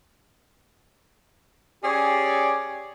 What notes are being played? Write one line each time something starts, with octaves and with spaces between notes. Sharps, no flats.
C#4 G4 G#4 C#5 D5